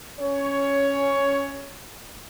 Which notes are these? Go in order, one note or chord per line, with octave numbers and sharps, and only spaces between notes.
C#4 C#5